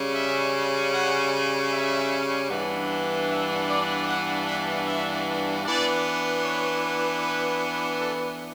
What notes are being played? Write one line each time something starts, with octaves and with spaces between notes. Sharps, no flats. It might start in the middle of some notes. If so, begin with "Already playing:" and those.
Already playing: C#3 G3 C#4
E5
F#5
E5
G2 E3 B3 D4
E5
D5
F#5
E5
E5
E3 B3 D4 D5
C#5
B4
A4